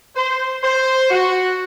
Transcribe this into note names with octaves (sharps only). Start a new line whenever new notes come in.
C5
C5
F#4